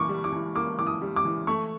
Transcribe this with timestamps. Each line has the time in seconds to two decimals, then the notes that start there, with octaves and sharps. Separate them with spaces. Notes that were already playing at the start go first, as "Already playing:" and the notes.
Already playing: E3 A#3 C#6 D6
0.09 G3
0.24 D6
0.32 E3
0.55 A#3 D6
0.79 E3 D6
0.87 D#6
1.02 G3
1.16 D6
1.25 E3
1.47 A3 C#6